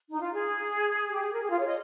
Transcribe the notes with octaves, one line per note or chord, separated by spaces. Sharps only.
D#4
F4
G#4
G4
G#4
A#4
G#4
F4
C#5
D#5